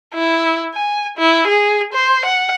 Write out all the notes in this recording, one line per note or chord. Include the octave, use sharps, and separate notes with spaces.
E4
G#5
E4
G#4
C5
F#5